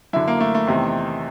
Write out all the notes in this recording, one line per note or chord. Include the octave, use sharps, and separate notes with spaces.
F#2 D3 E4
A#3
A3
A3
E2 C3 D#3